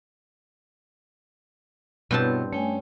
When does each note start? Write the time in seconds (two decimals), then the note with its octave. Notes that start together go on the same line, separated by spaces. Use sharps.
2.11 G2 B2 B3 C4 E4 C#5 A5
2.53 A3 C#4 G5 G#5